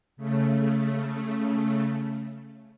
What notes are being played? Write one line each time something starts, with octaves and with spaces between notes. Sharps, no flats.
C#3 A3